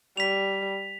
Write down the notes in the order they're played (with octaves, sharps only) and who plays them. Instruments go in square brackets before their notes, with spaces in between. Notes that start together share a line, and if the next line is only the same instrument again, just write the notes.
[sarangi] G3 [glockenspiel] B6 F7